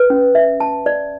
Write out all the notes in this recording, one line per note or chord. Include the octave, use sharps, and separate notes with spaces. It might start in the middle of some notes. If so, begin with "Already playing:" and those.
Already playing: B4
C#4
E5
A5
D5